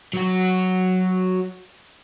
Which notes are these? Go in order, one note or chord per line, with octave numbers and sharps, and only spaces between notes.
F#3 F#4